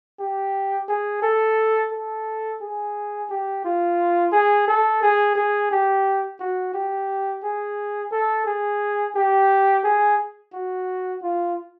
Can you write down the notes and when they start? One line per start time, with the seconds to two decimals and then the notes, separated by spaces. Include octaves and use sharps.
0.19 G4
0.88 G#4
1.22 A4
1.92 A4
2.61 G#4
3.30 G4
3.65 F4
4.32 G#4
4.68 A4
5.02 G#4
5.36 G#4
5.71 G4
6.40 F#4
6.74 G4
7.43 G#4
8.11 A4
8.46 G#4
9.16 G4
9.84 G#4
10.53 F#4
11.22 F4